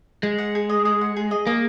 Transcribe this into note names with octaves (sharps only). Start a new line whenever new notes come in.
G#3 G#4
F#5
G#4
D#5
G#4
F#5
G#4
D#5
A#3 G#4